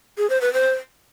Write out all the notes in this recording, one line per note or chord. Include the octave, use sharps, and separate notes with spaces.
G#4
C5
B4
C5